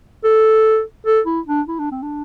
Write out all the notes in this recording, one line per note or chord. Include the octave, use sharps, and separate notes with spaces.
A4
A4
E4
D4
E4
D4
C4
D4